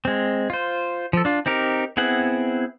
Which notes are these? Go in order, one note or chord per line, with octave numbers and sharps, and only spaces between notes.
G#3 C4
F4 C5
F3 A4
D4 F4
C4 D#4 G4 A#4
B3 C4 E4 G#4 F#5